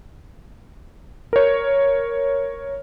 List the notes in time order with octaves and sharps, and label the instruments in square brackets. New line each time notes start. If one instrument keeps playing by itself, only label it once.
[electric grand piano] A#4 C#5